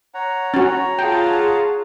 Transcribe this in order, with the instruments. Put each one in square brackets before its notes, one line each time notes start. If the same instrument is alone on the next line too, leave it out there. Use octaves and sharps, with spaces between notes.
[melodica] C#5 F#5 A#5
[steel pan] C#4 F#4
[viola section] F4 G#4 A5 [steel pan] G5